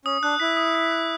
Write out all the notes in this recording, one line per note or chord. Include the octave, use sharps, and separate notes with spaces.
C#4 D#6
D4 F#6
E4 B6
D#6
B6
F#6